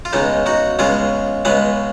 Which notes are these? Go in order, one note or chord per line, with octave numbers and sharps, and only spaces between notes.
F4
C#2 C#3 G#3 B3 D#4
D#4 F#4
C#2 C#3 G#3 B3 F4 G#4
C#2 C#3 G#3 B3 G#4 B4